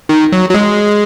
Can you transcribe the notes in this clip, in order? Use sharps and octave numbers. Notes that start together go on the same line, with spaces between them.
D#3
F#3
F#3
G#3